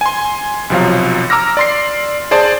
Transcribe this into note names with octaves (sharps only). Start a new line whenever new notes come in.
G#5 C6
B1 C3 F3 F#3 F5
A#5 D6 E6 F6 A#6
D5 C6 C7
G#4 C5 D5 A5 C6